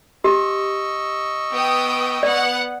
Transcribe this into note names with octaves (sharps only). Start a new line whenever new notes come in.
G4 D#5 C#6 E6
B3 G5 D#6
B3 D5 F#5